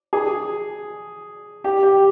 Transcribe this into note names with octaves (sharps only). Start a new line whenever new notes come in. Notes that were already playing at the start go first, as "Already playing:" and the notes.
G#4
G4
G4